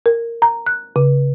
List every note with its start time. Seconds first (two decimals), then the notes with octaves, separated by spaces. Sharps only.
0.06 A#4
0.42 A#5
0.67 F#6
0.96 C#3